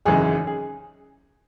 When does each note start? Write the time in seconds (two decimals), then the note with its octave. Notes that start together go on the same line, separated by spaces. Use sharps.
0.05 G#1 F#2 C#3 E3 G#3 G#4
0.47 G#4